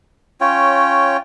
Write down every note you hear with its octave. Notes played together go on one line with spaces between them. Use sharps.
C#4 F4 C#5 G5